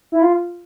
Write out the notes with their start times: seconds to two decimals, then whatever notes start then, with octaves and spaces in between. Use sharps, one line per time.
0.12 E4
0.22 F4